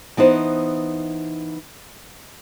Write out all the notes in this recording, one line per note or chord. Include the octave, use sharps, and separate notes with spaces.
E3 B3 D#4 C5